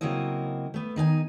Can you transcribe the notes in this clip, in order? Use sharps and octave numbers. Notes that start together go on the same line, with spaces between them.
C#3 F#3 A#3 C4 E4 D#5
A3 B3
D#3 D#4 E5 G#5